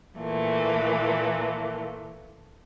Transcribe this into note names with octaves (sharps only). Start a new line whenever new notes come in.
A#2 E3 A3 A#3